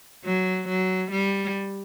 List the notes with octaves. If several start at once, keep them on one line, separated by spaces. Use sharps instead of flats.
F#3
F#3
G3